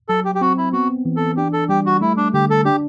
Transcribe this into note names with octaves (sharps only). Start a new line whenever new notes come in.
F#3 A4
G4
G4
C4 F#4
E4
B3 F#4
E3
A4
D4 G4
A4
G3 G4
F#4
A3 E4
D4
D3 G4
A4
D4 G4